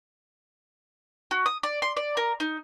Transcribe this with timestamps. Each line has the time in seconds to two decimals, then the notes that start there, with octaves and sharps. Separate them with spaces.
1.31 F#4
1.46 D#6
1.63 D5
1.82 C6
1.97 D5
2.17 A#4
2.40 D#4